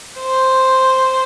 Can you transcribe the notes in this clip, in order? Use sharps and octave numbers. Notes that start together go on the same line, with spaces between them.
C5